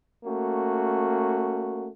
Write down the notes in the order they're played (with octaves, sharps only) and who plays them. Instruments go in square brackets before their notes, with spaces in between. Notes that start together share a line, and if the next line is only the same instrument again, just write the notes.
[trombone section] A3 A#3 C#4 F#4